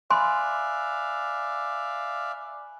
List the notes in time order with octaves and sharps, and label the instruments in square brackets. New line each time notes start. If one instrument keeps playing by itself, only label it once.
[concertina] D5 E5 F5 [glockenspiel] G#5 B5 F#6 [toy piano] C6